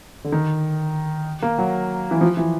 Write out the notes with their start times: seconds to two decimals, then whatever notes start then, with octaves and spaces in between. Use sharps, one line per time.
0.24 D3
0.32 D#3
1.42 A#3
1.58 F#3
2.11 E3
2.21 F3
2.37 E3